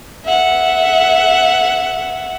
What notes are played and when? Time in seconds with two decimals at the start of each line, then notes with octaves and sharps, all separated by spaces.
0.25 E5 F#5